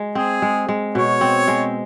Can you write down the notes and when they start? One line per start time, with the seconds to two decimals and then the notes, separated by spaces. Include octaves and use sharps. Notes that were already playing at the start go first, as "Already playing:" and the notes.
Already playing: G#3
0.15 C4 G#4
0.42 G#3
0.69 G#3
0.95 B2 C#5
1.21 C4
1.48 G#3